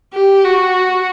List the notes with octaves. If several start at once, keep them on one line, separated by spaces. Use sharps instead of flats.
G4
F#4